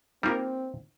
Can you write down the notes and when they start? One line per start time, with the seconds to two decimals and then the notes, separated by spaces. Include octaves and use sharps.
0.23 G3 A#3 C4 D#4 F4 A#4